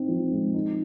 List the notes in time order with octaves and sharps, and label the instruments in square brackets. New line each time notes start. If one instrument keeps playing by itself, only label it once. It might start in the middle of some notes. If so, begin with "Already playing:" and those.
Already playing: [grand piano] C4 D#4
F3
G#3
D#4